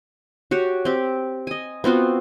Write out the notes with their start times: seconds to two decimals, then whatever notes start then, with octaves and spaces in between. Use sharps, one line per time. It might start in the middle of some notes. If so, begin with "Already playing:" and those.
0.51 F#4 G4 C#5
0.85 C4 G4
1.47 D#5 G#5
1.84 B3 C4 F4 F#4